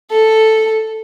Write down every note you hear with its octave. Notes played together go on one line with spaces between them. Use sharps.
A4